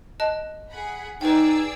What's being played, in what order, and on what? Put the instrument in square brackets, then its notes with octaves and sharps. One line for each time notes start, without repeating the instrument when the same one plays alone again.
[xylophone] D#5 A5 F#6
[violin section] G#4 F#5 B5
[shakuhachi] D#4 [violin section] G#4 D5 E6 [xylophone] B4 G5